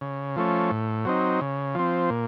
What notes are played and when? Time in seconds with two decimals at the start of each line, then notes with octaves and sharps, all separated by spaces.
0.01 C#3
0.36 F3 A3 C#4
0.71 A2
1.05 F#3 C4 D#4
1.41 C#3
1.75 F3 C4
2.10 A#2